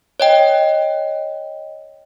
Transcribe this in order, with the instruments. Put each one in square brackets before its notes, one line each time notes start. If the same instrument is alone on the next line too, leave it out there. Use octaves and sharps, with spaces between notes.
[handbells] C#5 D#5 G5